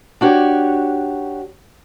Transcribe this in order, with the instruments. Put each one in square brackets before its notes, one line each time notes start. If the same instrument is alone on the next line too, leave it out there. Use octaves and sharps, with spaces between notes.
[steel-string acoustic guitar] D4 F#4 G4 C#5